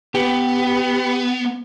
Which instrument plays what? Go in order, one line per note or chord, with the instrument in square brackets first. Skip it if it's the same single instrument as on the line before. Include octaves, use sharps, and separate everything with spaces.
[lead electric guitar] B3 [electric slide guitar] G4